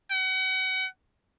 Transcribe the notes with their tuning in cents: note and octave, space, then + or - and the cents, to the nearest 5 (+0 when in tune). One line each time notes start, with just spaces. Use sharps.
F#5 +35